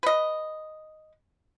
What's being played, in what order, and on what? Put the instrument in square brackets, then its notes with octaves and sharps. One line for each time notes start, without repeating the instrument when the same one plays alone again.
[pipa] B4 D#5